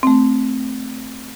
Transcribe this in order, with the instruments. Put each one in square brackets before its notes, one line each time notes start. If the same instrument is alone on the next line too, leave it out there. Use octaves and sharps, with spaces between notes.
[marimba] A3 C4